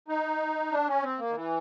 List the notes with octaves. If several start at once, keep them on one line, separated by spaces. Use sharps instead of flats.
D#4
D4
C#4
C4
A#3
D#3
E3